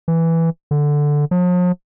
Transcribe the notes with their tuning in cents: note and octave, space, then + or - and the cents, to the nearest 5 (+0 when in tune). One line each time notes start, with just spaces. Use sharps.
E3 +0
D3 +0
F3 +45